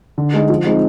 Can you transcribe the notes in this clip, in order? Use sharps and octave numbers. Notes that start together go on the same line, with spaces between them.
D3
G#3 D#4
F3
G#3 C4 D#4